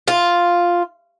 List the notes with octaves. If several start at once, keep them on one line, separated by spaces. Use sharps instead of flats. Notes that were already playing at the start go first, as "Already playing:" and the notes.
F4